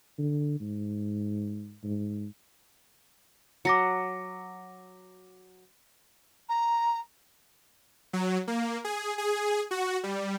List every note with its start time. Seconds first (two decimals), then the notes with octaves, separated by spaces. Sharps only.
0.19 D3
0.60 G#2
1.84 G#2
3.65 F#3 D6 A#6 C#7
6.49 A#5
8.13 F#3
8.48 A#3
8.84 G#4
9.18 G#4
9.71 F#4
10.03 G3